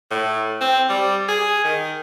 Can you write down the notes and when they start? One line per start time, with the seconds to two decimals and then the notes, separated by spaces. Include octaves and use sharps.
0.11 A2
0.61 C4
0.89 G3
1.28 G#4
1.64 D#3